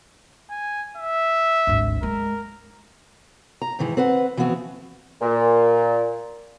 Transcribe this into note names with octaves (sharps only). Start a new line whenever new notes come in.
G#5
E5
G#1 D2
G#3 A#4
A#5
G#2 D#3 E3 G#3
C4 B4 F#5
E3 F3 B3 C4 F#4
A#2